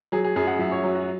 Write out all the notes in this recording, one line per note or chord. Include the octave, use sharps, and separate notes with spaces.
F#3 G#4
G#4
F#2 G#4
F#5
F#2 E5
C#5
F#3
F#4